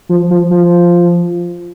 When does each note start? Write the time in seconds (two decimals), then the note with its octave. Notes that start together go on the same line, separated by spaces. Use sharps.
0.09 F3
0.30 F3
0.51 F3